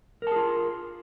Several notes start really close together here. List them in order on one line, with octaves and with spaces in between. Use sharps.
A#4 A5 G#4 F4